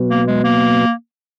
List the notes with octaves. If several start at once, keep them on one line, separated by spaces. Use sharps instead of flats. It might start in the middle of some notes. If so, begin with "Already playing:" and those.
Already playing: B2 F#3 B3
A#3
G#3
A#3